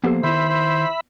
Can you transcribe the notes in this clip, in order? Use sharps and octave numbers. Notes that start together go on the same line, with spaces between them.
F3 A#3 B3 G4 A4 C5
D#3 E4 C5 E5 B5
C5